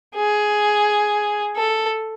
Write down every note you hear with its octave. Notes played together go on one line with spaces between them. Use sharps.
G#4
A4